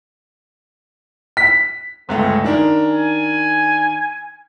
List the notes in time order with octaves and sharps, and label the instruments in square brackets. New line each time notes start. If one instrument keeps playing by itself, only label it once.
[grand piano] B6
[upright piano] G1 C#2 A3 [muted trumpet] G#3
[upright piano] D#3 D4 A#4
[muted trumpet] G#5